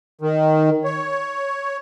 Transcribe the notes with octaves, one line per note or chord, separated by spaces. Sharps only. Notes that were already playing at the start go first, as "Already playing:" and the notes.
D#3
C#5